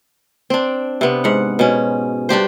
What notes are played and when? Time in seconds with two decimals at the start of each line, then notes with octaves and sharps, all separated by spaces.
0.50 C4 D4
1.01 C3 B3
1.24 G#2 F#5
1.59 B2 C#4
2.29 G2 D4 G4 C5